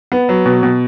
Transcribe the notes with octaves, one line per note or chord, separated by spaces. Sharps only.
B3
F#3
B2
B2